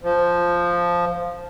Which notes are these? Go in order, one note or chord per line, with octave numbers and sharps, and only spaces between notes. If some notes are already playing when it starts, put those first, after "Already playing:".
F3